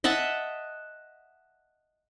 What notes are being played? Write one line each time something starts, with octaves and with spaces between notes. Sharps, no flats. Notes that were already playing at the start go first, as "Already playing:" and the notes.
D#5 E5 F#5 A5